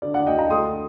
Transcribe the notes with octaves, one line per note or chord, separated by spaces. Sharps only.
D3 D5
D5 F#5
D2 D#5 G5
G5 A#5
A3 C6 D#6